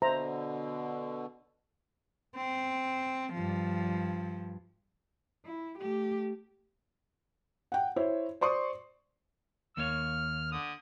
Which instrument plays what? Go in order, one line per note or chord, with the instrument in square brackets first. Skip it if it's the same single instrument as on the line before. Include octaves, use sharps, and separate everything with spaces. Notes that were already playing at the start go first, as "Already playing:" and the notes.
[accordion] B2 D3 [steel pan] C5 E5 A#5
[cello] C4
G2 F3
E4
A3 G4
[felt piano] F#5 G5
E4 C5 C#5
C5 D5 C6 C#6 D#6
[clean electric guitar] D#2 A#3 C#5 [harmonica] F6
[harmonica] D3 D#6